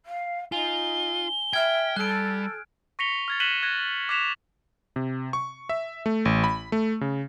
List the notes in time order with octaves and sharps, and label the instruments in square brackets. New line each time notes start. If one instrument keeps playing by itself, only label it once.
[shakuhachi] F5
[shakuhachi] D#4 [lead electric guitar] F4 [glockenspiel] G#5 [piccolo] G7
[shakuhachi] E5 [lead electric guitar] G5 [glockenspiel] F6 G#6
[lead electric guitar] G3 [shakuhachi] A4 [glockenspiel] F#6 D7
[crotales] C#6 A#6 B6 C#7 F7 G7
F6 G#6 A6
F#6 B6 D#7 E7 F#7 G7
F#6 G#6 A#6
D6 F#6 G#6 B6 E7 F7
[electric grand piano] C3
C#6
E5
A3
A1
B5
A3
C#3